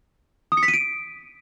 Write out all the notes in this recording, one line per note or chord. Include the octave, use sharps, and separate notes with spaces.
D#6
C#7
B6
D#7
D7